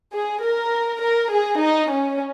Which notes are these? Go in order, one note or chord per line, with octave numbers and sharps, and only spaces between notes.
G#4
A#4
A#4
G#4
D#4
C#4